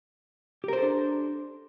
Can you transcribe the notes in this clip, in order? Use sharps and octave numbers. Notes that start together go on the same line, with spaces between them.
D4 G4 A4 A#4 C5